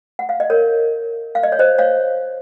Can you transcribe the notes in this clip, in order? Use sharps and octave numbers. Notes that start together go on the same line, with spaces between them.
F#5
F5
D#5
A#4 C#5
F5
D#5
C#5
C5 D#5
C#5 F5